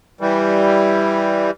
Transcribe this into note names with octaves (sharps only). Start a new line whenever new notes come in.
E3 G3